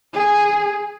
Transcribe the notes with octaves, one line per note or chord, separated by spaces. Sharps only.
G#4